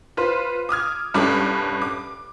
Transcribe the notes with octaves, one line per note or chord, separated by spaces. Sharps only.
F4 B4 C5
D6 D#6 F6 G#6
C2 G2 C#4 A4 B5 D6
D6